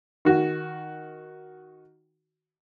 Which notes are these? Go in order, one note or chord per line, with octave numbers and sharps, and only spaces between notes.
D#3 F#4